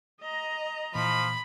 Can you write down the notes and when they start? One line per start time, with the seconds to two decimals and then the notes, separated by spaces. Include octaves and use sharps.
0.21 D#5 A#5
0.95 A#2 E3 F3 B5